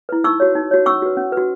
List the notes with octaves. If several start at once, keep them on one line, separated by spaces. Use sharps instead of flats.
E4 B4
D#4 C#6 E6
F#4 C#5
D#4
F#4 C#5
C#4 C#6 E6
F#4 B4
C#4
B4
F#4